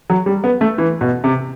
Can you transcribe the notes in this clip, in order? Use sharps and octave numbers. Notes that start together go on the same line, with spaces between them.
F#3
G3
B3
A3
E3
B2
C3